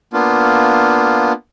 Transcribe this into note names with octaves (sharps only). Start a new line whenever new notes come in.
A#3 B3 D4 F4